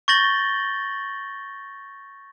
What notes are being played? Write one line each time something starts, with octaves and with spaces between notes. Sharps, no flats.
C#6 G6 A6 A#6 F#7 G7